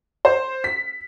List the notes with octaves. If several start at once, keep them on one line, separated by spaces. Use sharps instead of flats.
C5
B6